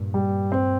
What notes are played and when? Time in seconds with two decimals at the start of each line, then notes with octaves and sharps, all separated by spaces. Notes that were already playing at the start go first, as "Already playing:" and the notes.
Already playing: G2 A#2
0.14 G3
0.52 C4